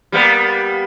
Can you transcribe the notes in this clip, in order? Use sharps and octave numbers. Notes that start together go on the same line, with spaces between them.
G3 A#3 B3